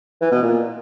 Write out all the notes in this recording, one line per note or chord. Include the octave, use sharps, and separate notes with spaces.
E3
B2
A#2